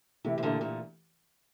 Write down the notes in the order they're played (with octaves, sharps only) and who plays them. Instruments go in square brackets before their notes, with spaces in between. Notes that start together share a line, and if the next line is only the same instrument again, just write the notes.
[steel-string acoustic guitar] C3 [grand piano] E3 A3 E4 G4
[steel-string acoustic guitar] C3
A#2 D3
A#2 D3